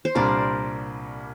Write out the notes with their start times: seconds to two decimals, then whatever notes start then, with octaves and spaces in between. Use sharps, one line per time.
0.05 C5
0.15 C2 A#2 G3 D4 A#4 D5